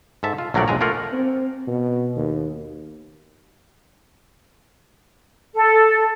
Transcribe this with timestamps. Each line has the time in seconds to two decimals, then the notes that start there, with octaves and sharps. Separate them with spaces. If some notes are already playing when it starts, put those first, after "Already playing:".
0.23 G#2 A4 E5 A5
0.38 F4
0.54 A#1 F#3 A3 A#4 D5 F#5
0.68 B1 F2 G#3 G#5 A#5
0.81 A3 A#3 F4 A#4 F#5
1.13 C4
1.68 B2
2.16 D#2
5.54 A4